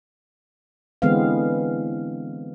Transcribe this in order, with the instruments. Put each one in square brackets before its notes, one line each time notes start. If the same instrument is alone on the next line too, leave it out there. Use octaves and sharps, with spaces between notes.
[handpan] D3 E3 G#3 B3 C4 F5